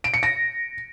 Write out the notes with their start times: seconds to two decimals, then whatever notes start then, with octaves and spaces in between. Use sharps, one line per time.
0.04 D7
0.14 C#7
0.23 A#6